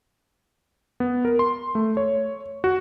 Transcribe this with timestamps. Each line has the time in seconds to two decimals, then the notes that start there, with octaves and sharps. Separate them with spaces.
1.00 B3
1.25 A#4
1.39 C6
1.75 A3
1.97 C#5
2.64 F#4